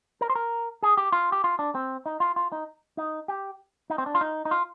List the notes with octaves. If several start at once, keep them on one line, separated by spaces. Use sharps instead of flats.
A#4
C5
A#4
G#4
G4
F4
G4
F4
D4
C4
D#4
F4
F4
D#4
D#4
G4
D#4
C4
D4
F4
D#4
D#4
F4